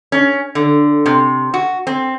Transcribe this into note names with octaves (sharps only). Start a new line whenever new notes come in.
C#4
D3
C3
F#4
C4